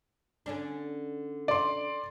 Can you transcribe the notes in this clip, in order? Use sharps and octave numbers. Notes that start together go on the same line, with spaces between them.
D3 C#4 D4
D5 C6